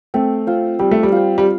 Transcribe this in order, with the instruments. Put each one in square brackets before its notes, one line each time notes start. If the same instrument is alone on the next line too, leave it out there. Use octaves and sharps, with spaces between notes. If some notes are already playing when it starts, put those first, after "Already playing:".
[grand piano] A3 [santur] C4
[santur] F4 C5
[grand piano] G3 [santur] C4
[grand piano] A3
G3
[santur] F4 C5
[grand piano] G3